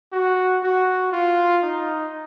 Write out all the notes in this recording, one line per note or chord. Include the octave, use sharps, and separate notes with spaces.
F#4
F#4
F4
D#4